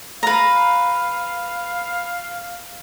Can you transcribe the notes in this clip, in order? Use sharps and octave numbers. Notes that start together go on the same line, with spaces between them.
B4 F5 A#5